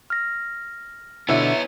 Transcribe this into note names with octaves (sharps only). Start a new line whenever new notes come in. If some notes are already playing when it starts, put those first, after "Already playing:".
F6 A#6
B2 D3 B3 E4 C#5